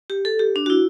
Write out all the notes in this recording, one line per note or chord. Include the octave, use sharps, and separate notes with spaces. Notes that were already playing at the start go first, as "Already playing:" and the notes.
G4
A4
G4
D4
F#4
E4